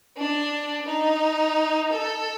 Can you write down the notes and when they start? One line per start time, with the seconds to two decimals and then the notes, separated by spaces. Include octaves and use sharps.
0.17 D4
0.86 D#4
1.92 A4